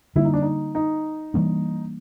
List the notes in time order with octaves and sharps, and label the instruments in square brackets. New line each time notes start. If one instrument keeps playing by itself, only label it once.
[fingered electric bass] D3 G3 A#3 [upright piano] E4
[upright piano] D#4
D4
D#4
D#4
[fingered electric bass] E3 G3 A#3 D4